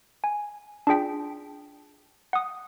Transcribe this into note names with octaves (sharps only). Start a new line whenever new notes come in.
G#5
D4 F4 G#4 G5 B6
F#5 D#6